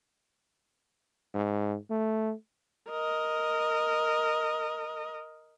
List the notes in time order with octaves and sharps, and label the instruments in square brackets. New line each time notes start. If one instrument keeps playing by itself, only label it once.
[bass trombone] G#2
A3
[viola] A#4 D#5